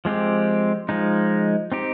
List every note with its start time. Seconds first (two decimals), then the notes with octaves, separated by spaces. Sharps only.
0.05 F3 G#3 C4 G4
0.89 F3 G#3 D#4
1.72 C4 D#4 G4